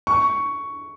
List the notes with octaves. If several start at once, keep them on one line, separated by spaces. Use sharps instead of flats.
C#6